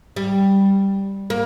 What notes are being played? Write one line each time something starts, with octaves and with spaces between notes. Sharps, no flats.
G3
A#3